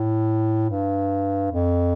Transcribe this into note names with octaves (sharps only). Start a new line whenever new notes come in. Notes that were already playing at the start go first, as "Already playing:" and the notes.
Already playing: A2
G2
F2